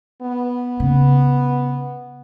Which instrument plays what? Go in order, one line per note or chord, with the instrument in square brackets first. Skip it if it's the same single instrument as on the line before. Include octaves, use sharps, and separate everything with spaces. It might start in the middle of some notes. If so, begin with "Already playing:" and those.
[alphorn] B3
[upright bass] C#3